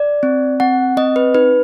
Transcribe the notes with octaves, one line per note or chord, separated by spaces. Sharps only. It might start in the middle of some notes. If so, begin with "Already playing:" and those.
Already playing: D5
C4
C4 F#5
C4 D#5
B4
D#4 B4